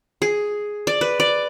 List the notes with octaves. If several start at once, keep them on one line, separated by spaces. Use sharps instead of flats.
G#4
D5
B4
D5